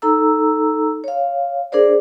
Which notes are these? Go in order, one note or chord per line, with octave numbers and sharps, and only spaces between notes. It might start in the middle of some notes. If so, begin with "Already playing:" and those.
D#4 A4 A#5 E6
C#5 F5
D4 G#4 A#4 C5 D5